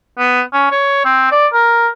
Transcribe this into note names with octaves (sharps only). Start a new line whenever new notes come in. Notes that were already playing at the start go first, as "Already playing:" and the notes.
B3
C#4
C#5
C4
D5
A#4